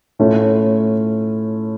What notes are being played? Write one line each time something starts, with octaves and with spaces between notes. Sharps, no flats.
A2 A3 C#4 F4